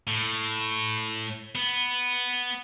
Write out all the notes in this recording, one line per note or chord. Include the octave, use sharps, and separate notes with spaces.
A2
B3